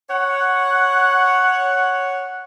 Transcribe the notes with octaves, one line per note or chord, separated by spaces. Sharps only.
C#5 F#5